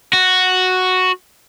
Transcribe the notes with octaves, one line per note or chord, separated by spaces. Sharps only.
F#4